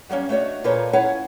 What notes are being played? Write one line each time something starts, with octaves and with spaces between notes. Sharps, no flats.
F#3 G3 A#3 C#4
A3 D4 F#4 C#5 D#5
A#2 A#3 F4 A4 B4 C#5
C#4 E4 C#5 F5 F#5 G#5